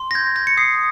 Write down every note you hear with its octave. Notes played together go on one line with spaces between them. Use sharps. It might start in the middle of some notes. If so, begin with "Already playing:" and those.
Already playing: C6
A#6
G6 G#6
G6 A#6
C#7
D#6 C7